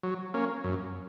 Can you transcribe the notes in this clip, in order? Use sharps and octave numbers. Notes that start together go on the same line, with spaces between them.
F#3
A#3 C#4
F#2